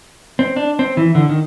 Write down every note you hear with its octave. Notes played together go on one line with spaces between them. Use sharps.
C4
D4
C4
E3
D3
D#3